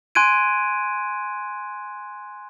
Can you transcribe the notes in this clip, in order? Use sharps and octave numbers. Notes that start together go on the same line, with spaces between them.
G#5 C6 F#6 G#6 D7 D#7